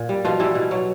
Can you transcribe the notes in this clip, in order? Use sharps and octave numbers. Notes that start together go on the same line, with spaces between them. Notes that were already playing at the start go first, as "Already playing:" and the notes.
Already playing: A#2
G3
B2 F3 F4
E3 G3 E4
B2
F#3